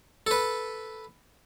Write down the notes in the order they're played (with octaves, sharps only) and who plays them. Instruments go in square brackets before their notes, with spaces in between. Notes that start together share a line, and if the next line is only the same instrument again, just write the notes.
[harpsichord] A4 B4